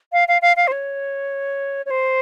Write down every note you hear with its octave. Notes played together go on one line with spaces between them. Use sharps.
F5
F5
F5
F5
C5
C#5
C#5
C5